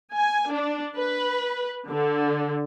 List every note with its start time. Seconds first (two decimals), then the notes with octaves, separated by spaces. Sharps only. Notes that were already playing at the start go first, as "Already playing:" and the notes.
0.13 G#5
0.52 D4
0.95 B4
1.88 D3